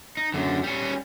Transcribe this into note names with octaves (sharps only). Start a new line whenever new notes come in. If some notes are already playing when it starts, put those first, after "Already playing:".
D#4
F#2 D3
G3 C#4